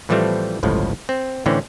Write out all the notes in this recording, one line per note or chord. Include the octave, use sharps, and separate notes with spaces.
A2 E3 F3 G3 A3 C4
G1 C#2 A2 F3
C4
A2 D3 E3 C4 C#4